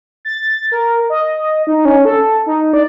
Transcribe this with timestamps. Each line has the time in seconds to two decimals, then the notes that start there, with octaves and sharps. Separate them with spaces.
0.25 A6
0.72 A#4
1.10 D#5
1.67 D#4
1.85 C#4
2.05 A4
2.46 D#4
2.73 D5